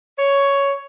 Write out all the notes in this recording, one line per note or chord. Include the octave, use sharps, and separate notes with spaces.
C#5